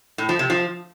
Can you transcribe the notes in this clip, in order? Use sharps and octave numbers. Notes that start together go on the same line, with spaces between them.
A2
F3
C3
F3